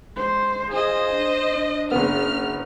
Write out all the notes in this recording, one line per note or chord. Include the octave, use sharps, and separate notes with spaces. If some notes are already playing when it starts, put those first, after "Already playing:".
G#3 C5
F4 G#4 C5 D#5
D4
D4
F#1 B3 F6